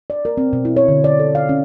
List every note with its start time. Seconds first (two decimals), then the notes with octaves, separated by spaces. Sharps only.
0.10 D5
0.25 A#4
0.37 C4
0.53 B2
0.65 E4
0.76 C#5
0.88 D3
1.04 D5
1.20 A4
1.35 F5
1.49 C#4